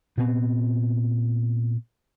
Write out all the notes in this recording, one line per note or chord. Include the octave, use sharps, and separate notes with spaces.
A#2 B3 C4